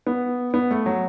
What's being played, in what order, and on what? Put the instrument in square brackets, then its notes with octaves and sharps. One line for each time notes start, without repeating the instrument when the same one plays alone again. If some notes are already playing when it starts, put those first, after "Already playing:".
[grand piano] B3
B3
A3
F#3